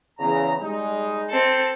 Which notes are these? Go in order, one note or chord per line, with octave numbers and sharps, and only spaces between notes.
E2 C#3 A#5
G3 G#3 D#4
C4 A4